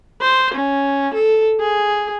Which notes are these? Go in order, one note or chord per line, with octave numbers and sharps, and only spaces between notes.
C5
C#4
A4
G#4